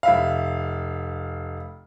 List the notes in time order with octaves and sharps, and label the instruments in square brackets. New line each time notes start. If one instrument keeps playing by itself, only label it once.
[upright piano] F1 E5 F5